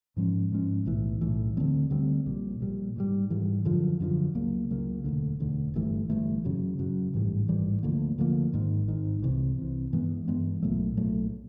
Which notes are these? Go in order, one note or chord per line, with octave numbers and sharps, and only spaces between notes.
G#2 F3 G#3 C#4
G#2 F3 G#3 C#4
B1 A2 E3
B1 A2 E3
D2 D3 G3 C4
D2 D3 G3 C4
A#1 A#2 G3
A#1 A#2 G3
G#2 E3 G3
G#2 E3 G3
F#2 D3 F3
F#2 D3 F3
C#2 C#3 F#3 A#3
C#2 C#3 F#3 A#3
E1 D2 D3
E1 D2 D3
G1 G2 E3 A3
G1 G2 E3 A3
F#2 C#3 F#3
F#2 C#3 F#3
A1 G#2 E3 G3
A1 G#2 E3 G3
D2 D3 F3 A#3
D2 D3 F3 A#3
G#1 G#2 D#3
G#1 G#2 D#3
C2 C3 E3
C2 C3 E3
G2 E3 G#3 B3
G2 E3 G#3 B3
B1 A#2 F#3 A3
B1 A#2 F#3 A3